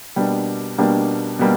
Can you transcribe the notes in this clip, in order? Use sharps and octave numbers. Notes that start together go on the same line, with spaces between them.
B2 G3 A#3 D4
B2 G3 A#3 D4
B2 G3 A#3